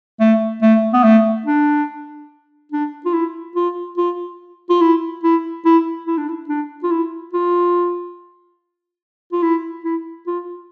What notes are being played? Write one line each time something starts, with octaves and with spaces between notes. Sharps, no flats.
A3
A3
B3
A3
D4
D4
F4
E4
F4
F4
F4
E4
E4
E4
E4
D4
E4
D4
F4
E4
F4
F4
E4
E4
F4